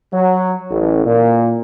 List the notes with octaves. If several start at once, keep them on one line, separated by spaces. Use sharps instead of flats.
F#3
A1
A#2